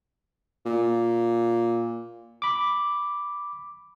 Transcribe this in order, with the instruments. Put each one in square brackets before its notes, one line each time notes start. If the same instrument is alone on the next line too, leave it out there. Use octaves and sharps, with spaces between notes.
[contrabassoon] A#2
[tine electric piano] B5 D6